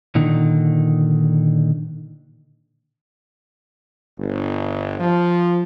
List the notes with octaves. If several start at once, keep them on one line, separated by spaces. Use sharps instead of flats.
A#2 D3 D#3 D#4
G1
F3